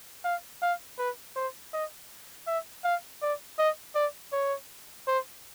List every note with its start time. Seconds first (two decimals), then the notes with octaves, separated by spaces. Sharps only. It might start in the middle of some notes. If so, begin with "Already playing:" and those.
0.24 F5
0.62 F5
0.98 B4
1.36 C5
1.73 D#5
2.47 E5
2.84 F5
3.22 D5
3.59 D#5
3.95 D5
4.32 C#5
5.07 C5